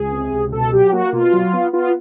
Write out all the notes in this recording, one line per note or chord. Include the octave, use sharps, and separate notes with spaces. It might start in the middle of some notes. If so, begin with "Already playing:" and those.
Already playing: C#2 G#4
C3
C#2
B2 A4
F#3 G4
A#3 F#4
B2 F4
F#3
B3
B3 F4